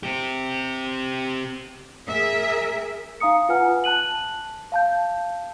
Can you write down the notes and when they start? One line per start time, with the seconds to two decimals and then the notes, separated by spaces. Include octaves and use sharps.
0.03 C4 G4
2.07 G#4 A#4 E5
3.20 D#4 F5 A#5 D#6 C#7
3.49 F4 B4 F#5 G#5 F6
3.84 A5 F#6 D#7 F#7
4.72 F5 A5 G6